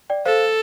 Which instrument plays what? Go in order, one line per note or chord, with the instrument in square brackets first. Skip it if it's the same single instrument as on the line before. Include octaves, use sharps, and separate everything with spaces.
[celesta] D5 G5
[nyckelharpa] A4 [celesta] C5 F5